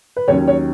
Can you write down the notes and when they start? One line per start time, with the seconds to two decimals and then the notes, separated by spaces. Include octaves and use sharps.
0.16 B4
0.28 D#2 D#3 F#3 C#4 C#5
0.48 C#5